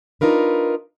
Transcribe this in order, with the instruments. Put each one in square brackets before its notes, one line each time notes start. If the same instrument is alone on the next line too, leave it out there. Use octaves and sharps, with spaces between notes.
[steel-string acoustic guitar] D4 D#4 F4 A#4 B4